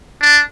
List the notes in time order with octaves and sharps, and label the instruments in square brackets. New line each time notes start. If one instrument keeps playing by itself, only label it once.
[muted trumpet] D4